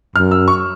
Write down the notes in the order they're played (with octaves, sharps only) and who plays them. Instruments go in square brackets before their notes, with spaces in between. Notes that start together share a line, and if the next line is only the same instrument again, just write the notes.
[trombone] F#2 [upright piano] F6
[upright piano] E6
C#6